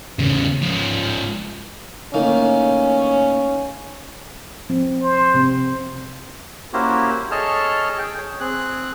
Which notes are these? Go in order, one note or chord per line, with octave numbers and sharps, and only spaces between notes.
E2 C#3
G#2 F3
A2 D#3 A#3 C#4
F3 C4
C5
C3 C4
A#3 C#4 E4 F#4 G4 C5
G#4 A4 C#5 D#5 A5 F6
G#4 G5
C#5
C4 G#4 F#6